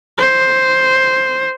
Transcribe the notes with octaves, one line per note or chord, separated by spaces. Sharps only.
C5